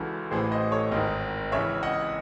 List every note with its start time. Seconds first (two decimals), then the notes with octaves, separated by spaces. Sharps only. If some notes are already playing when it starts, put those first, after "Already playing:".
Already playing: C#2 C#3 E3 F#4 A4
0.31 A1 A2 E3 G#4 C5
0.51 C5 D#5
0.71 A4 C#5
0.91 G#1 G#2 D#3 C5 D#5
1.52 C#2 C#3 E3 C#5 E5
1.83 D#5 F#5